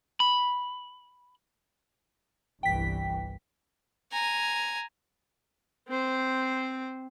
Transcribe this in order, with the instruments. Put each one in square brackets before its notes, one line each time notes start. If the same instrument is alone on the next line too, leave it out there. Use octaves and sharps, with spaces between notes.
[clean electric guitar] B5
[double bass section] G1 C2 E3 [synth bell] G5 B6
[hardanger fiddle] G#5 A#5
[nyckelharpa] C4 C5